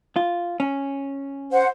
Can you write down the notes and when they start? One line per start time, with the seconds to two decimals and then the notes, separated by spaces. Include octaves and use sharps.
0.16 F4
0.60 C#4
1.51 C5 F#5